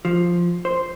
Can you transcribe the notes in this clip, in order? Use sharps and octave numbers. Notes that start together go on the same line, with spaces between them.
F3
C5